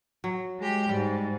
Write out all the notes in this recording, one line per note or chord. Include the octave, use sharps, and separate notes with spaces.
F#3
G#3 G4
G#2 G3